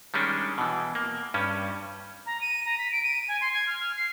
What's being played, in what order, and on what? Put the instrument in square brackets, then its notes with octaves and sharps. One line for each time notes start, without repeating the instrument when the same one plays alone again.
[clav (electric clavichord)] D#3 G3 G#3 C#4 D4
B2 E3
A#3
G2 G3 C#4
[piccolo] A#5
D#7
A#5
B6
D7
D#7
G#5
C6
G#6
F6
F6
C7